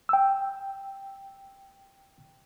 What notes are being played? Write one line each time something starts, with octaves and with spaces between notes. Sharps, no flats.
G5 E6